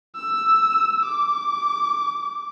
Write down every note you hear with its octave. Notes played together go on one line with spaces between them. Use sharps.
E6
D6